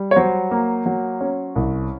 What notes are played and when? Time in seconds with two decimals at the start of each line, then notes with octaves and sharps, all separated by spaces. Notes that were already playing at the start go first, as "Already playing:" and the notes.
Already playing: G3
0.11 C#5
0.16 F#3 C5
0.51 A#3
0.86 F#3
1.21 C#4
1.56 C2